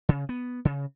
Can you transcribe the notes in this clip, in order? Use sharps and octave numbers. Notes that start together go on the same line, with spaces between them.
C#3
B3
C#3